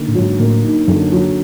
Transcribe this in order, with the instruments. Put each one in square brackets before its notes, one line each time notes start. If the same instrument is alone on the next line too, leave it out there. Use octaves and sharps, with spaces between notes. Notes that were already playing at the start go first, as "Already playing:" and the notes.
Already playing: [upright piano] D3 A#3 D#4
[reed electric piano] A2
[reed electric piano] G#2 [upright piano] F#3
[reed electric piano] A2 [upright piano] A#3
[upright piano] D#4
[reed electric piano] F#2 [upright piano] D3
[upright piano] F#3